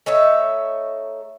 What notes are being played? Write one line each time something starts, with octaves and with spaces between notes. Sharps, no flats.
A3 D#4 C#5 E5